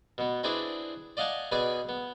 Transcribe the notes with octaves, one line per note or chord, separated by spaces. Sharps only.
B2 B3
C4 D4 E4 G#4 B4 D5
D5 D#5 F5 F#5 G#5 A5
B2 G#4 B4 D5 G#5 B5
B3